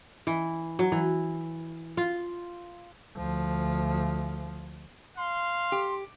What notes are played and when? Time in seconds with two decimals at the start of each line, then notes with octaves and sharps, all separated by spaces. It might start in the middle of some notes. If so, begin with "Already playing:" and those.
0.27 E3
0.79 F#3
0.92 E3
1.97 F4
3.17 D2 F3
5.17 F5 C6
5.72 G4